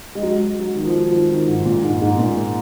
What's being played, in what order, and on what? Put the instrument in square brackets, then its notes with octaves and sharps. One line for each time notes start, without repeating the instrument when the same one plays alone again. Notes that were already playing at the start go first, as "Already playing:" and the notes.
[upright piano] G#3
F#3
F#3
D#3
F3
F#3
F3
D#3
D#3
G#2
A#2
G#2
G#2
A#2